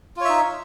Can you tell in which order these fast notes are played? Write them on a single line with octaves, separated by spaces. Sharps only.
F4 C#5 E5 D#4